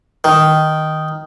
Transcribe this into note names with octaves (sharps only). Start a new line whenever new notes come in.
D#3